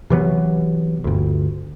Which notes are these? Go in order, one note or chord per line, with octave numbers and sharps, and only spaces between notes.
C3 E3 F#3 B3
G1 D2